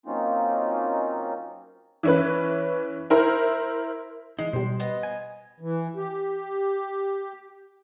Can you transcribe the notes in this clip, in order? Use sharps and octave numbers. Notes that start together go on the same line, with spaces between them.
F#3 A#3 C4 C#4 D#4 F4
E3 C#4 B4
E4 A#4 C5
E3 G#3 D#4
B2 G3 C5
B3 D#5
G#5
E3
G4